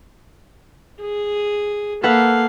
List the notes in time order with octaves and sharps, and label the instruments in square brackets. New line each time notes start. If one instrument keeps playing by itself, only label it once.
[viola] G#4
[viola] A#3 F5 [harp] A4 B4 F#5